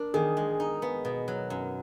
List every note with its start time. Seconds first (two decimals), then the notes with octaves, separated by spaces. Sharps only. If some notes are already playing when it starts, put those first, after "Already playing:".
Already playing: D4 A#4
0.14 D#3 G#4
0.37 G#3
0.60 D#4
0.82 B3
1.05 B2
1.28 F#3
1.50 F#2